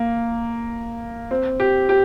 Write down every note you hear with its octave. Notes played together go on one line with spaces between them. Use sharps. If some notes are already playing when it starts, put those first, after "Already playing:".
Already playing: A#3
C4
G4
G4